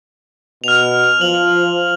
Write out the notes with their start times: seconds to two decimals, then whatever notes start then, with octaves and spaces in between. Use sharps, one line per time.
0.64 B2 F6 F7
1.21 F3 F#7